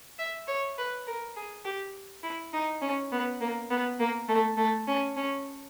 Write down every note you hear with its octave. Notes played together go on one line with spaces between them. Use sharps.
E5
C#5
B4
A#4
G#4
G4
E4
D#4
C#4
B3
A#3
B3
A#3
A3
A3
C#4
C#4